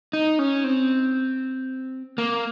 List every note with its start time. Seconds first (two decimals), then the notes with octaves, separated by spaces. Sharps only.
0.13 D#4
0.39 C#4
0.64 C4
2.18 A#3